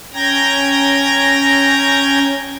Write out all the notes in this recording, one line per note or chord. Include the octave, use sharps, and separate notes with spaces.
C#4 G5 A#5 G6 G#6 A#6